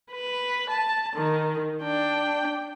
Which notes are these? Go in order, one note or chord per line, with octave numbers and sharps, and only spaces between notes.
B4
A5
D#3
D4 G5